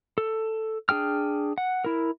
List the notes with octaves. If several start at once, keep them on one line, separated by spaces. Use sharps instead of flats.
A4
D4 G#4 G5 F6
F#5
E4 A#4